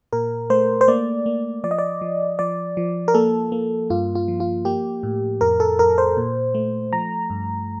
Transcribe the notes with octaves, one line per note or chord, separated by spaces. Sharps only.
A#2 A#4
A3 C5
C5
A#3 D5
A#3
F3 D5
D#5
D5
F3
F3 D5
F3
A#4
A#3 A4
A#3
G2 F4
F4
F3
F4
A#3 G4
A2
F2 A#4
A4
F2 A#4
C5
A#2
A3
F3 A#5
G2